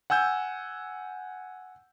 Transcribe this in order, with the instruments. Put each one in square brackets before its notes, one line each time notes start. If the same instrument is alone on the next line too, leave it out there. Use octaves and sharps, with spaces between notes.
[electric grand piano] F#5 G#5 E6 G6